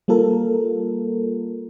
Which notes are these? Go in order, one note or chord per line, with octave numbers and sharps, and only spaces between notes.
G3 A#3 F4 A4 A#4